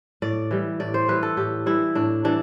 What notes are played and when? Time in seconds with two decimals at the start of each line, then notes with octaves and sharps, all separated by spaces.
0.22 A2 D5
0.51 E3 G3
0.80 A2 D5
0.94 C5
1.08 E3 G3 B4
1.23 A4
1.37 A2 G4
1.66 E3 G3 E4
1.95 A2 D4
2.24 E3 G3 D4